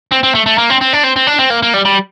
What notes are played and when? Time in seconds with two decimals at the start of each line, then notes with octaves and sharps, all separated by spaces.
0.12 C4
0.23 C4
0.35 A3
0.46 A3
0.58 A#3
0.70 C4
0.81 C4
0.93 D4
1.03 C4
1.16 C4
1.27 D4
1.39 C4
1.50 A#3
1.63 A#3
1.74 G3
1.85 G3